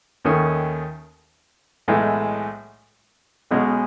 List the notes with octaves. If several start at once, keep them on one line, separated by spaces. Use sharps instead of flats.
D#2 D#3 A3 C#4
B1 A2 E3 G#3
B1 B2 G#3 C#4